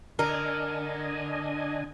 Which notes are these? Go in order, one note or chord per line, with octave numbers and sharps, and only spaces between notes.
D3 D4 A#4 D#5 G#5